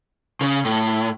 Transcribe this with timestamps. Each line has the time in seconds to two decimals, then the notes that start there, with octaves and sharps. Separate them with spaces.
0.41 C#3
0.65 A2